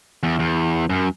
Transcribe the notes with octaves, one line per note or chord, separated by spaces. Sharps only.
E2
E2
F#2